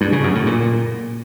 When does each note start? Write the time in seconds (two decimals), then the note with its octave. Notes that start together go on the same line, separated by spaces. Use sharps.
0.01 G2
0.12 C#3
0.24 F#2
0.35 A2
0.46 A#2